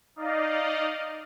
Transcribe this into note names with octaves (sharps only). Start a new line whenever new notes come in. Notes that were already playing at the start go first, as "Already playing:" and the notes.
D#4 D5 D#5 F5